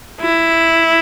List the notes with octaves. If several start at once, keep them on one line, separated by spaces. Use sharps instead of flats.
E4